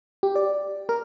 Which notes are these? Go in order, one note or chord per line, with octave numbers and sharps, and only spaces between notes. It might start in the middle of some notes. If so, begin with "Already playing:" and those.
G4
D5
A#4